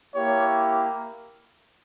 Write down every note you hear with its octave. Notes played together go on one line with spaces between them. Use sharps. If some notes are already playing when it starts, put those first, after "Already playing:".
A#3 E4 G4 C#5